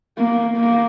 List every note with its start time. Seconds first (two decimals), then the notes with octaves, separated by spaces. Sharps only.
0.18 A#3
0.57 A#3